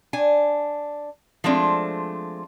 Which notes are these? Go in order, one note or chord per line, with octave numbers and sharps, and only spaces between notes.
D4 G#5
F3 G#3 A3 C4 D4